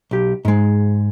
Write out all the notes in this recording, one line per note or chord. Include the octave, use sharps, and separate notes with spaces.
B1 G4
G#2 G#3